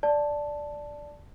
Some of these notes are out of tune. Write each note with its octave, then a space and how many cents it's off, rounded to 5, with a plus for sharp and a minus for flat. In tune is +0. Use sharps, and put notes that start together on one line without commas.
D5 +0 A5 +0